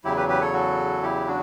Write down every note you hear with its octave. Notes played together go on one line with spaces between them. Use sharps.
E2 C#3 F#3 E4 G4
G4 B4
G4 B4
A4 C#5
F#4 A4
E4 G4
D4 F#4